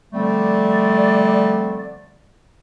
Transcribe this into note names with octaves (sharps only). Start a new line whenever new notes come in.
D3 F3 G3 A3 C4 D5